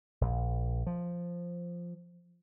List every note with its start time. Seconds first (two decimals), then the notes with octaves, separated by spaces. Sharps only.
0.21 A#1
0.86 F3